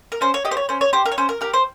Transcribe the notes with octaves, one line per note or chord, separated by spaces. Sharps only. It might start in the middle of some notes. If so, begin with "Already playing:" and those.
A#4
C#4 C5
C#5
G4 D#5
C5
C#5
C#4 C5
C#5
G4 C5
A#4
C#5
C#4 C5
A#4
G4 A#4
C5